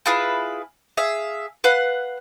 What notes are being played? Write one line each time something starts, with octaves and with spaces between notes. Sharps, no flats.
E4 F4 G#4 B4
G#4 E5 F5
B4 F5 F#5